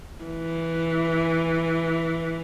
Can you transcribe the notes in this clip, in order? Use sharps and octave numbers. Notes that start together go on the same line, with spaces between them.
E3